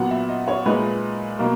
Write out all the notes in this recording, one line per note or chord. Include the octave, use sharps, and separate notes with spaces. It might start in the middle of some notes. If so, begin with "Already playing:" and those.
Already playing: A#2 F#3 B3 F#5
E5
D#5
C#5
A#2 G#3 D#4 B4
B2 F#3 A#3 D#4 A#4